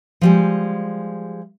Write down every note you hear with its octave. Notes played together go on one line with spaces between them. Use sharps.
F3 G3 G#3